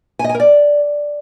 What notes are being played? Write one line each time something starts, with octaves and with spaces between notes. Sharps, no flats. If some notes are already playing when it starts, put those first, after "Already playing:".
G#5
D#5
G#5
A#4
D5